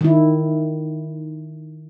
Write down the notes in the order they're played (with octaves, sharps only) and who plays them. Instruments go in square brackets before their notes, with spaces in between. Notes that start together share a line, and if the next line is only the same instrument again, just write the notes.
[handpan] D#3 E4